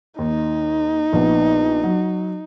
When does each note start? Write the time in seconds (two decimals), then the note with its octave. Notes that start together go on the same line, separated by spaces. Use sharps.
0.18 D#2 D#4
1.13 A#1 B3
1.84 F#3